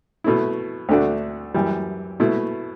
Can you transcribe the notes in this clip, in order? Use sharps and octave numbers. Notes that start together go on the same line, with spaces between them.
B2 A3 E4
D2 D3 A3 D4 F#4
F#2 E3 G3
B2 A3 E4